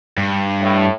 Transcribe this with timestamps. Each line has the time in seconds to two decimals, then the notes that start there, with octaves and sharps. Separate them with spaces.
0.18 G2
0.60 A2